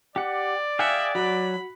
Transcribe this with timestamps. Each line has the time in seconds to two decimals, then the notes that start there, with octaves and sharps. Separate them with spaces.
0.16 G4 D5 F#5
0.79 G#4 E5 F5 G5 G#5 F#6 C#7
1.15 F#3 F#4 B5